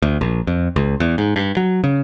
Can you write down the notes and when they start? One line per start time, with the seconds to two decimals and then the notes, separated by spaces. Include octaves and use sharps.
0.02 D2
0.21 A#1
0.47 F2
0.76 C#2
1.00 E2
1.18 G#2
1.36 G2
1.57 F#3
1.84 C#3